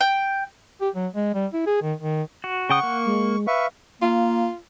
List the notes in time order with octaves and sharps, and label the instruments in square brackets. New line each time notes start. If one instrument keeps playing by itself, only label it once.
[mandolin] G5
[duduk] G4
F#3
G#3
G3
E4
G#4
D#3
D#3
[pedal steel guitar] F#4
[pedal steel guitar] C#3 G5 D#6 [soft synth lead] F#5 [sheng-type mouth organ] C#6
[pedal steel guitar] A#3
[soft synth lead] G#3
[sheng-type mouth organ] B4 E5 C#6 [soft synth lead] F5
[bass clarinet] A#3 [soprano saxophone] F4